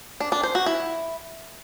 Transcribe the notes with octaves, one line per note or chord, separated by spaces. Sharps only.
D4
D4
C5
F#4
E4